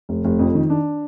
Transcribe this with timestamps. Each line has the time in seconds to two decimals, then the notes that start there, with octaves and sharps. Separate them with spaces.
0.09 F1
0.25 F1
0.39 F2
0.55 D#3
0.70 D4